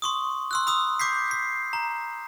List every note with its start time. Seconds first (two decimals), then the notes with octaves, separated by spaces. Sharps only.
0.02 C6 C#6 D#6
0.51 C6 E6 F#6
0.67 B5 D#6 E6
0.99 D6 G6 B6 C7
1.31 C7
1.73 A#5